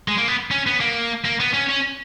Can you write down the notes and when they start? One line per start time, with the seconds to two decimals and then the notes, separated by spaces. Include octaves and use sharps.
0.08 G#3
0.18 A#3
0.28 B3
0.51 C#4
0.67 B3
0.80 A#3
1.25 A#3
1.40 B3
1.54 C#4
1.69 C#4